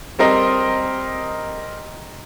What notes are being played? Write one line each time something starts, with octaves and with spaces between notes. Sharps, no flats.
G3 C4 A#4 D#5